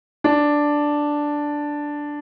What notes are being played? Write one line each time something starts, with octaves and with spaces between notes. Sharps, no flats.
D4